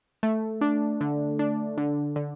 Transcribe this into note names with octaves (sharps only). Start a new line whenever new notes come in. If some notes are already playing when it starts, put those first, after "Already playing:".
A3
D4
D3
D4
D3
D3